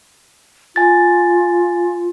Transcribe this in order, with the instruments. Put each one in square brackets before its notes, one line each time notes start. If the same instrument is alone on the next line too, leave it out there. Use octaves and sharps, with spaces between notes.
[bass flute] F4 [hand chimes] G#5 A6